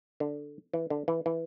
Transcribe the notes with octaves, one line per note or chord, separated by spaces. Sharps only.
D3
E3
D3
E3
E3